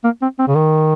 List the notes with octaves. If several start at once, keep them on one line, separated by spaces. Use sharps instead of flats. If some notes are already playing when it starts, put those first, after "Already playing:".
A#3
C4
C4
C#3
D#3